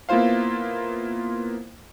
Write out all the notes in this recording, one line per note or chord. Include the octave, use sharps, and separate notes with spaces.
A#3 B3 E4 F4 C5 F5